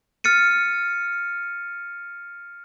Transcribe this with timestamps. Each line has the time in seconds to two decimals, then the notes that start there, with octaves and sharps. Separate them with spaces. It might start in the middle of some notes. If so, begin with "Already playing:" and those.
0.24 F6 A6 C#7 D#7